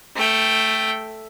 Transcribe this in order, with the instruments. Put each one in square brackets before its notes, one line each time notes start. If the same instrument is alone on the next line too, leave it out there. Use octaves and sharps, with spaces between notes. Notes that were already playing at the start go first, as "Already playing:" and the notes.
[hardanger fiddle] A3 G5